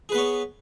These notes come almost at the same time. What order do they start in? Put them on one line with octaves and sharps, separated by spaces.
G#4 B4 B3 C#5